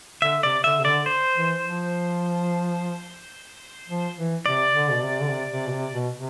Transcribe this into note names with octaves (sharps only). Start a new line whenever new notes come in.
D3 E5
C3 D5
D3 E5
C3
D3 D5
C5
E3
F3
F3
E3
C3 D5
D3
B2
C3
D3
C3
C3
B2
C3
B2
C3